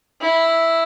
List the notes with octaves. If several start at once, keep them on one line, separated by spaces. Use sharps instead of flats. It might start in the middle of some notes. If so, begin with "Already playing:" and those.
E4